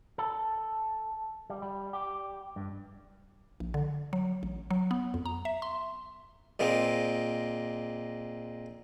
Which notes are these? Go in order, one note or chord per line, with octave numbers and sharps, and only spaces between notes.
A4
G3
G3
G4
G2
A#1
D3
F#3
A1
F#3
B3
F2
A#5
E5
C6
A#2 G#3 A#3 C4